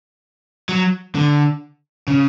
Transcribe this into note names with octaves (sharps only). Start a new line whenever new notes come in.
F#3
D3
C#3